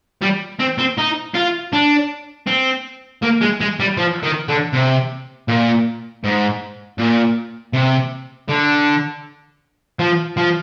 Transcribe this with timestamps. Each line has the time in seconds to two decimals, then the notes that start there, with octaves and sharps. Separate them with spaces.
0.22 G3
0.59 C4
0.78 C4
0.98 D#4
1.34 F4
1.73 D4
2.47 C4
3.23 A#3
3.41 G#3
3.61 G#3
3.80 G3
3.97 F3
4.23 D#3
4.49 D3
4.73 C3
5.48 A#2
6.24 G#2
6.98 A#2
7.73 C3
8.49 D3
9.99 F3
10.37 F3